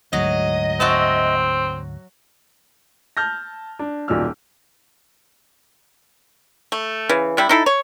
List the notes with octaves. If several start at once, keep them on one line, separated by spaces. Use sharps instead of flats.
D2 G#2 F#3 D#5
C4 F#4 E5 A5
A5 F6 G6 A#6
D4
D#1 B1 A#2 D5 E6 F6
A3
C#3 E3
C3 G3 E4
D#4 E4 A4
C#5